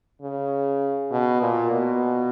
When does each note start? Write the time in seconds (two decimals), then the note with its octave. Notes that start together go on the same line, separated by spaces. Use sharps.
0.22 C#3
1.12 B2
1.41 A#2
1.72 B2